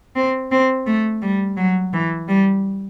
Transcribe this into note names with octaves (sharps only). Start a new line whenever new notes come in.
C4
C4
A3
G3
F#3
E3
G3